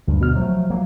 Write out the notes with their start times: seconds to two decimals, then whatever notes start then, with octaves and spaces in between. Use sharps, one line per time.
0.08 D2 G2
0.21 B2 F6
0.35 F3 F#3 G#3 A3
0.70 F#3 A#3